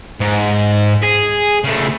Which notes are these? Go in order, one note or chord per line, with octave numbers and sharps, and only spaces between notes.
G#2
G#4
C#3 A3